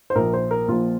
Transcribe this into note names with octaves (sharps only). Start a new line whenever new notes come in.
C5
A#1 A#2 F3 A#4
C5
A#4
A#1 A#2 F3 F4